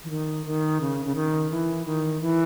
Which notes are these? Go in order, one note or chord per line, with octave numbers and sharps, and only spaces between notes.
E3
D#3
D#3
C#3
C#3
D#3
E3
D#3
E3